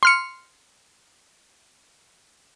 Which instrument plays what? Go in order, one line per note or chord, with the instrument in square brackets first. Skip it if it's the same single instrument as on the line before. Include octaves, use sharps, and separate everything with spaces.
[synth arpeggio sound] C6 F6 C#7